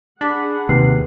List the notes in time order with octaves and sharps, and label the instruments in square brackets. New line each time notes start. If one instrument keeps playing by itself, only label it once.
[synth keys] D4 B5 [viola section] G#4 F#5 [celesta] A5 D6
[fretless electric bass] D#2 [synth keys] C3 [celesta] B4 F#6 C7